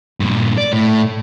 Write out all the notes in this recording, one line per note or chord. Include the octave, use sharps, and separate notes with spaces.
G2 A#2
D5
A2